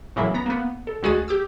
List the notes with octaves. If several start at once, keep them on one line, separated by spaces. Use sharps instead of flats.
A2 C#3 E3 F#3 A#3 E4
B3 A#5
A#3 B3
A4
D2 G#3 F#4 G#4 D#6 A6
G4 D6 E6